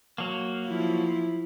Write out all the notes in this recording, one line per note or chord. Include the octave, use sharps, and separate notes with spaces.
F#3 A#3
F3 E4